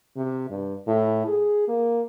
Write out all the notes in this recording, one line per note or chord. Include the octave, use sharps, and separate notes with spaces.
C3
G2
A2
G#4
A#3